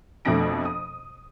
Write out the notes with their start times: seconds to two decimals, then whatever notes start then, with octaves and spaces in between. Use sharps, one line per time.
0.25 F2 B2 A3 D4 A#6 D7
0.65 D#6